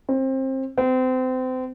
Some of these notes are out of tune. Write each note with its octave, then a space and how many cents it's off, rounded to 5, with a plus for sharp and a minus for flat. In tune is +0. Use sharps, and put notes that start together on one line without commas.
C4 +25
C4 -30